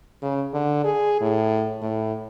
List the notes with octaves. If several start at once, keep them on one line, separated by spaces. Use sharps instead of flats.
C#3
D3
G#4
A2
A2